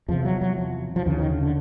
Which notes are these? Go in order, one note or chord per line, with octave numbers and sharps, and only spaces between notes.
E2 C3 F3
F#3
F#3
F3
F3
D#2 C#3 E3
D#3
D3
D3